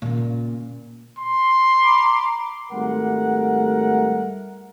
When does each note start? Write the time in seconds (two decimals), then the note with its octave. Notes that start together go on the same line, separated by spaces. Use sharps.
0.02 A#2 C#3
1.18 C6
1.82 A#5 B5 D6
2.72 G#1 G3 A3 A#4 F#5